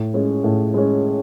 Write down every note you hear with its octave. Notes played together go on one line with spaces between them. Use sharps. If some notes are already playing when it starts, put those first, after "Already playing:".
Already playing: A2
G#3 C#4
A2
G#3 C#4